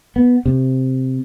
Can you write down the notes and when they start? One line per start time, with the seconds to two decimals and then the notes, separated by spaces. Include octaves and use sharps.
0.16 B3
0.46 C3